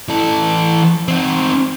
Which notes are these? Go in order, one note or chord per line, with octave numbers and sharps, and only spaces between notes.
E3 A4
C4 D#4